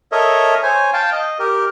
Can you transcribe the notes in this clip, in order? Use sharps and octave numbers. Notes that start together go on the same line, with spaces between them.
A4 A#4 C#5 D#5 E5
C5 C#5 G#5
F5 G5 A5
D#5
G4 A#4